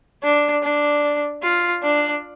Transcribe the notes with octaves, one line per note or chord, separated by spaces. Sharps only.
D4
D4
F4
D4